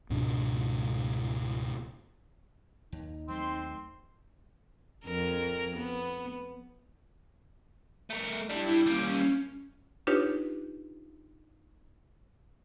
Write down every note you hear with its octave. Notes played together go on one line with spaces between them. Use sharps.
C#2 G#2 B2 D4
D#2 D#4
D#2 F#3 A3 C4 C6
F2 A#4
B3
A3 A#4
G3 D4 E4
G3 A#3 C#4
D4 D#4 F4 G4 B4 C#5